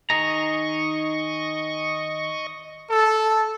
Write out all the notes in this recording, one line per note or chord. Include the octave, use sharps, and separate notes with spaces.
D#3 G#4 D#5 A#5 C#6
A4